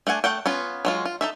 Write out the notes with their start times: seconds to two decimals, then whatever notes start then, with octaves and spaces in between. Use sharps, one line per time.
0.07 A3 D4 F#5 G#5
0.24 A3 F#5 G5
0.46 B3 C#4 F4
0.85 F#3 G#3 F4
1.05 F4
1.21 D#4 A4 E5